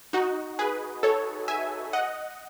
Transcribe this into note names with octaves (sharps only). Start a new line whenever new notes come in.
D#4 F#4
G#4 B4
A4 C#5
E5 G#5
D#5 F#5